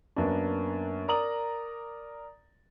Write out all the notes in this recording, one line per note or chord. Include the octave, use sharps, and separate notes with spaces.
F#2 A#3 B3 D4
A#4 D5 A#5 D#6 F#7